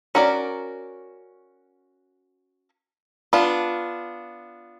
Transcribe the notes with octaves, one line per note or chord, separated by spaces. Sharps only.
C#4 F#4 A#4 D5
B3 D4 F4